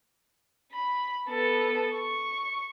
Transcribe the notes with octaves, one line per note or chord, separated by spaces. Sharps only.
B5
B3 A4
C#6